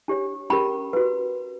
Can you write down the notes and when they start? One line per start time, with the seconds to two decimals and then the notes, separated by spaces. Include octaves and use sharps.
0.08 D4 G4 C#5
0.50 C#4 G4 A#4 B5
0.93 F#4 B4